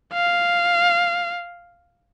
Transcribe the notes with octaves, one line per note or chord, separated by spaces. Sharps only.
F5